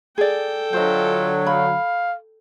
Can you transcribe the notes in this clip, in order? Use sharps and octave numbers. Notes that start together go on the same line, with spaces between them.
G#4 A4 D5 G5
D3 F#3 F4 C5 D#5
F5 B5